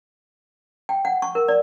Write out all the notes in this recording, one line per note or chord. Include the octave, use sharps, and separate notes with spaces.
G5
F#5
C#6
A#4
D5